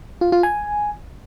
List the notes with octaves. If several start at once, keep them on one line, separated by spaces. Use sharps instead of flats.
F4
F4
G#5